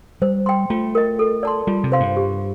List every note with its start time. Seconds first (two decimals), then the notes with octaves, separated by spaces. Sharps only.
0.22 G3 C5
0.46 G5 C6
0.70 A3 F4
0.95 A#4 D#5
1.19 A4
1.43 D5 A5 C6
1.67 G3 F4
1.84 C3
1.92 C5 F5 C6
2.00 G2
2.16 G4